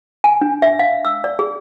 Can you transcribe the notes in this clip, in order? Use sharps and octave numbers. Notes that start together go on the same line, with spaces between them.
G#5
D4
E5
F5
E6
D5
G#4